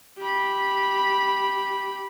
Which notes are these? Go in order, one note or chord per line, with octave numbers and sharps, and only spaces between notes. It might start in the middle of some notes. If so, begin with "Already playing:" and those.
G4 B5